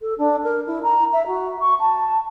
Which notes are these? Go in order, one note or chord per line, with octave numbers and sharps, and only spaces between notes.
A4
D4
A#4
E4
A#5
E5
F#4
C#6
A5